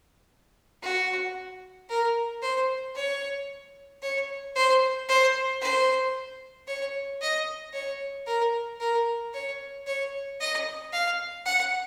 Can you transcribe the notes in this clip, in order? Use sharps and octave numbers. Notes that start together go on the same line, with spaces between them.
F#4
A#4
C5
C#5
C#5
C5
C5
C5
C#5
D#5
C#5
A#4
A#4
C#5
C#5
D#5
F5
F#5